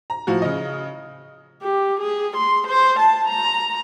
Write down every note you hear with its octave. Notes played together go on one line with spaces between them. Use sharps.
A#5
A2 F3 F4 F#4
C#3 D#5
G4
G#4
C6
C5
A5
A#5